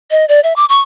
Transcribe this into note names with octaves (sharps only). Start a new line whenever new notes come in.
D#5
D5
E5
D6
C#6